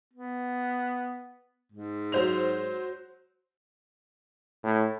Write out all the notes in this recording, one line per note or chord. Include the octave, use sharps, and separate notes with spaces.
B3
G#2
F#3 C5 F7
A2